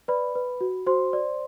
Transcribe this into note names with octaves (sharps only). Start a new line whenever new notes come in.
B4 D5 B5
B4
F#4
F#4 C5 C6
D5